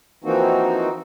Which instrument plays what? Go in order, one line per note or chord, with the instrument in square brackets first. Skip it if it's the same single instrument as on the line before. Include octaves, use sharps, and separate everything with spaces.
[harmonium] E3 F3 A#3 C4 D#4 F#4